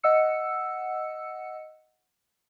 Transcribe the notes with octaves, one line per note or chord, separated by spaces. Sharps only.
D#5 F#5 E6 C#7